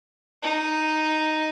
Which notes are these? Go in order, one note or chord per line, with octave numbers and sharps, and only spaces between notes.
D#4